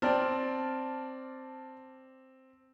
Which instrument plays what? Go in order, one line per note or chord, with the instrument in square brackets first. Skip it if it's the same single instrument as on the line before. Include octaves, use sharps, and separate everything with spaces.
[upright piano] C4 [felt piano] D5 A5 F6